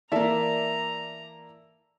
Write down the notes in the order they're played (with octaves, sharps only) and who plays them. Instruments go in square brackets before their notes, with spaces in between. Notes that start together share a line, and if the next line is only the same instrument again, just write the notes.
[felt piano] E3 A#3 [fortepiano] A4 D5 E5 [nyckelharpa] A#5